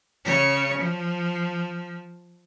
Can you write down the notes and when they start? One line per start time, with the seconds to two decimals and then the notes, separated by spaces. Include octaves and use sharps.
0.25 C#3 C#5
0.77 F3